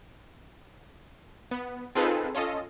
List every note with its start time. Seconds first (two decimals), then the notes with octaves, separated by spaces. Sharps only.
1.51 B3
1.95 C4 D#4 F4 G#4 A4 B4
2.35 C#4 F4 A4 D#5